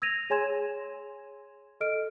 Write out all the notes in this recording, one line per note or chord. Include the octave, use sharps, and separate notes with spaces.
E6 G#6 A#6 D#7 F7
G#4 C#5 G#5 C6 G#6 E7
A4 D#5 F6 D7